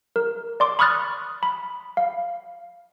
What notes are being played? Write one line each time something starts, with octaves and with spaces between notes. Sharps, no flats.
A#4
D5 C6 D6
B5 C#6 D#6 F6 F#6 A6
B5
F5